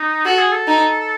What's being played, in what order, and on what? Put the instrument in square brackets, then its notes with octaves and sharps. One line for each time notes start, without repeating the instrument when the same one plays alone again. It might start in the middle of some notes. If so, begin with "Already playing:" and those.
Already playing: [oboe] D#4
[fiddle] F#4 [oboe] A4
[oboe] G#4
A4
[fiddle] D#4